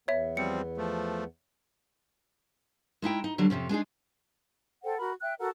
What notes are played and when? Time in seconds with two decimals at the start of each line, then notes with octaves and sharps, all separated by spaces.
0.08 E2 B3 C#5 E5
0.37 F3 G3 C4 C#7
0.77 F3 A3
3.02 G#3 D#4 E4 G5
3.24 D#4
3.38 D3 F#3 G3 D4
3.50 F2 G#2 C3 C#4
3.69 G#3 D4 D#4 G#4
4.83 A4 C5 F#5 G5
4.97 F#4 A#4 B5
5.22 E5 G5 F#6
5.39 F#4 A4 A#4 F#5